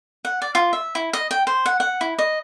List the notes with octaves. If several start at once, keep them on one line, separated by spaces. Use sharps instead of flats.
F#5
D5
F4
E5
E4
D#5
G5
C5
F#5
F#5
E4
D#5